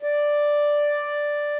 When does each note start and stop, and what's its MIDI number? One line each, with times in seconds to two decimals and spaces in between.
0.03 1.58 74